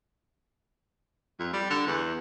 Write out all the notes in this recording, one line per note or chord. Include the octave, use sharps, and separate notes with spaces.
F2
G3
D3
E2